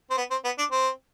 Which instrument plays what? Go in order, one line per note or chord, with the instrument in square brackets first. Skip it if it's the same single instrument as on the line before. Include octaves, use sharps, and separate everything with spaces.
[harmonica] C4
B3
C4
B3
D4
C4